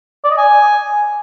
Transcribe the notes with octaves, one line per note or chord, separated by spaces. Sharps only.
D5
D#5
G#5